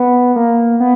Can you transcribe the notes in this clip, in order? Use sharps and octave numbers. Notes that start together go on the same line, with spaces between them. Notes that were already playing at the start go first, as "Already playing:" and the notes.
Already playing: B3
A#3
B3